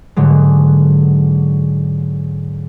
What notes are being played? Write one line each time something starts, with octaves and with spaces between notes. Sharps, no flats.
G#2 D3 F#3 G#3